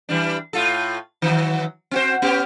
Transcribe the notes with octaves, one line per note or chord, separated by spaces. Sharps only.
E3 G3 D4
A2 F4 A4
D#3 E3 F#3
C4 F#4 C5
B3 C#4 G4